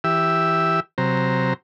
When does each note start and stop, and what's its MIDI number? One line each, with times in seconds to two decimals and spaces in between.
0.04 0.80 52
0.04 0.80 67
0.04 0.80 76
0.04 0.80 88
0.98 1.54 48
0.98 1.54 54
0.98 1.54 72
0.98 1.54 82